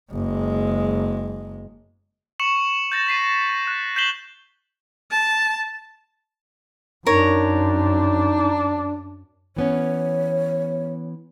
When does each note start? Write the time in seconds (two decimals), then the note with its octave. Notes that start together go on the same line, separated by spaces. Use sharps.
0.12 F#1 G#3
2.40 C#6 C#7 E7 F#7
2.92 G6 A6 A#6 E7
3.07 A6 B6 C7 D#7
3.67 F#6
3.96 G6 B6 C7 E7 F#7 G7
5.10 A5
7.07 F#2 D4 D#4 A#4 C#5
9.56 E3 B3 C#4 C#5